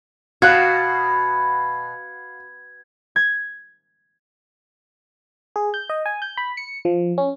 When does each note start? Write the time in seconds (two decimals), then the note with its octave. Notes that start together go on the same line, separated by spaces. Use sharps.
0.42 B2 F#4 F5 F#6 G#6
3.16 G#6
5.56 G#4
5.74 G6
5.90 D#5
6.06 G#5
6.22 G6
6.37 B5
6.57 C#7
6.85 F3
7.18 C#4